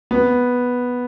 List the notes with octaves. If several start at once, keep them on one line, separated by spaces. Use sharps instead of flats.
B3